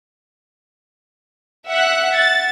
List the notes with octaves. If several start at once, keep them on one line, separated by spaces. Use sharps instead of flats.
E5 F#5 F#6
A6